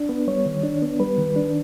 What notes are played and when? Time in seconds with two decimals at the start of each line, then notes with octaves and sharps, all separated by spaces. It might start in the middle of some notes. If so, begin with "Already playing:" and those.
Already playing: D4
0.09 B3
0.27 G3 C#5
0.45 D#3
0.64 D4
0.82 B3
1.00 G3 B4
1.17 D#3
1.36 D4